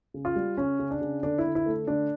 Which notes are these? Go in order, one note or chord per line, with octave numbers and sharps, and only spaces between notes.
C#3
F4
G3
C#3 C#4
C#3
D4
C#3
D3 D4
E4
D3
E4
A3
D3 D4